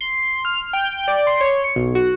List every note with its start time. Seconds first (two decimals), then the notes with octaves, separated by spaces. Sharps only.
0.01 C6
0.45 F6
0.73 G5
1.08 D5
1.27 C6
1.41 C#5
1.64 C#7
1.76 B1
1.95 F#4